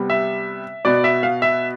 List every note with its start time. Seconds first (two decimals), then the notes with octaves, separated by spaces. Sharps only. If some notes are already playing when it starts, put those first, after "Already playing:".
Already playing: C3 G3 B3
0.10 E5
0.85 B2 B3 D5
1.04 E5
1.23 F5
1.42 E5